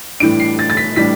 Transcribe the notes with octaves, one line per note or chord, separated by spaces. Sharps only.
A2 E3 G3 D4 D7
C7
A6
A6
B6
A2 E3 G3 D4 B6